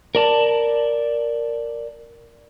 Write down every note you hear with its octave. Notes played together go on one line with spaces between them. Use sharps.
A#4 D5 A5